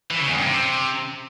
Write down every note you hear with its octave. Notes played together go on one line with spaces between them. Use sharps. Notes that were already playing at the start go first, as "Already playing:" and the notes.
E3
C#3
E2
G2
C3